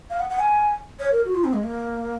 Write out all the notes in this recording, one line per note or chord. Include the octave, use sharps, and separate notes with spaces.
F5
F#5
F#5
G#5
C#5
A#4
F#4
F4
C4
G#3
A#3